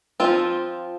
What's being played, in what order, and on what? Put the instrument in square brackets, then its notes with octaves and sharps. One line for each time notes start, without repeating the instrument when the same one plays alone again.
[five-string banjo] F3 C4 F4